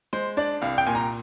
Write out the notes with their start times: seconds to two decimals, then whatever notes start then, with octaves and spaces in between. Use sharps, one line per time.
0.13 G#3 C5
0.37 D4 D5
0.62 C2 F5
0.78 G5
0.86 A#2 G#5
0.95 A#5